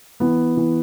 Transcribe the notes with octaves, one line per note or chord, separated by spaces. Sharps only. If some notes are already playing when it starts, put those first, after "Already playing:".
E3 B3
E3